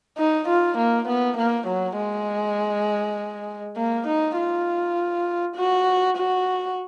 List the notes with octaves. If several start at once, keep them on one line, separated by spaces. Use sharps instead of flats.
D#4
F4
A#3
B3
A#3
F#3
G#3
A#3
D#4
F4
F#4
F#4